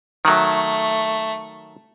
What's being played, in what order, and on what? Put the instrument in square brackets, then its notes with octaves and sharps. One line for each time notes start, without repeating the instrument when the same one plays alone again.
[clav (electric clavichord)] D#3 F#3 [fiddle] A3